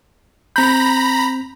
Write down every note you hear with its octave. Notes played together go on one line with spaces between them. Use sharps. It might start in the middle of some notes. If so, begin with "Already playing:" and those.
C4 A#5 B5 G6